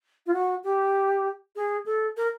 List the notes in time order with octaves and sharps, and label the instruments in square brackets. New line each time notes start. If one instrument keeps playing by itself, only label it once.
[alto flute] F4
F#4
G4
G#4
A4
A#4